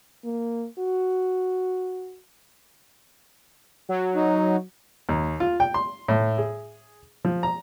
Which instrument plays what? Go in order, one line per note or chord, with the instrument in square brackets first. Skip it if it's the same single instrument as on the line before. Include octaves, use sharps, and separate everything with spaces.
[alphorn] A#3
F#4
[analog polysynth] F#3
[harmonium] D#4
[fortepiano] D#2
F4
G5
C6
A2
G#4
F3
A#5